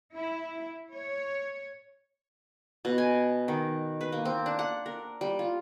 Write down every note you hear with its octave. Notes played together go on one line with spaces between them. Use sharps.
E4
C#5
B2
G#5
D#3
B4
A#3
C4
D4
F#5
A#4
G3
F4